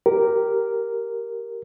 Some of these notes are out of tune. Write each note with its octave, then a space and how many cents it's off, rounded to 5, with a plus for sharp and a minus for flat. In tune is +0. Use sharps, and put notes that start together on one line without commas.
G4 -10 A#4 +0